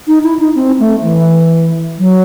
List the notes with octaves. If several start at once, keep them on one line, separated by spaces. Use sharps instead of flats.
D#4
E4
D#4
C4
A3
E3
F#3